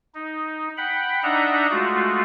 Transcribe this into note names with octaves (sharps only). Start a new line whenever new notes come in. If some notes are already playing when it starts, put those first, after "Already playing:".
D#4
F#5 G5 B5
D4 D#4 D#5 E5 F#5 A#5
G#3 A3 F4 F#4